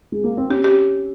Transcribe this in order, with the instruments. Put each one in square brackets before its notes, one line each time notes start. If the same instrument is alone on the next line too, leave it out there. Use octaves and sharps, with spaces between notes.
[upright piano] G#3
A#3
C4
[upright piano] C#4 [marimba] G4
[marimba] G4